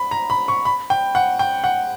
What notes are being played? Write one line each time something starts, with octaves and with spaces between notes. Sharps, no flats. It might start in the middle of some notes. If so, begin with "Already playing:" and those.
Already playing: B5
A#5
B5
C#6
B5
G5
F#5
G5
F#5